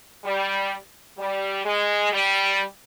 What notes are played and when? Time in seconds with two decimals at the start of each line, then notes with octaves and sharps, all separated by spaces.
0.25 G3
1.18 G3
1.65 G#3
2.12 G3